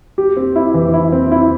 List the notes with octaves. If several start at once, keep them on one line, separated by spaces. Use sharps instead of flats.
G4
C4
E4
E3
E4
C4
E4